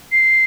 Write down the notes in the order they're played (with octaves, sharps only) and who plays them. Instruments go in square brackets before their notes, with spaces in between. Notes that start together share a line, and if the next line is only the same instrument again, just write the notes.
[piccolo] C7